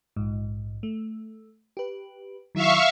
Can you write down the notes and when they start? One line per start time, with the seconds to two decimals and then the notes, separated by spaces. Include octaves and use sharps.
0.16 A#1 G#2
0.83 A3
1.77 G4 B4
2.55 D#3 F#3 E4 E5 F5 C#6